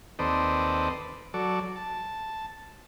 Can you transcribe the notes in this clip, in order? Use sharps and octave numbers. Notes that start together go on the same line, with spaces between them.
D#2 C4 A4 B4 D5 D#5
F#3 A4 D5
A5